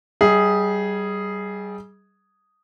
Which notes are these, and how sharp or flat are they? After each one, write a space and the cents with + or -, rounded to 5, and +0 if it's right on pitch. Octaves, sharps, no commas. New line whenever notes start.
G3 -20 G#4 +0 D#5 +45